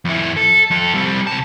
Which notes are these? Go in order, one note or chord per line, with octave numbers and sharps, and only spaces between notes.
F2 E4
A4
F2 A4
G3 C4
C2 A5